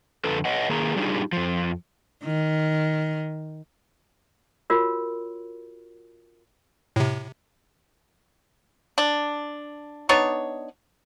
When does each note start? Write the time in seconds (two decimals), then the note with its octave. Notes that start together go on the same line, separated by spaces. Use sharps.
0.24 F2 D3 A4 B4
0.45 B4 C#5 D#5 F#5
0.69 D#3 A#3 G#4 A#5
0.96 G3 D4 D#4 F4 G4 G#4
1.32 F2 F3
2.24 D#3
4.70 F4 F#4 A#4 C#5
6.96 A2 C3
8.98 D4
10.09 B3 D4 D#4 C#5